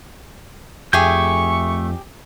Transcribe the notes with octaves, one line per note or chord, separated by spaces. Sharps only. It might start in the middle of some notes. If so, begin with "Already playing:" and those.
F2 A3 G4 G#4 E5 G#5 C#6 G6